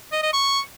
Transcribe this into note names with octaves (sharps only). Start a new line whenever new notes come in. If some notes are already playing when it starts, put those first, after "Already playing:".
D#5
D#5
C#6